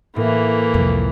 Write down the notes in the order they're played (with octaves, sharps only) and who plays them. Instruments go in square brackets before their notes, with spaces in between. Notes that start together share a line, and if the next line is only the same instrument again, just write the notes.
[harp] A2 [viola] E3 A#3
[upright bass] C2 F2